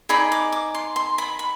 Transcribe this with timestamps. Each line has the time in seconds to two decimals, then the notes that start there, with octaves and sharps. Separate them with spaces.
0.09 D#4 G#4 D5 B5
0.32 D6
0.52 D6
0.75 C6
0.96 C6
1.18 B5
1.39 B5